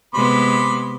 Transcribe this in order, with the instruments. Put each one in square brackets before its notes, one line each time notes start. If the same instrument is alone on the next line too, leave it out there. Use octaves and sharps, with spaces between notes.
[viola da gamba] C3 G#3 B3 [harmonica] B5 C6 D6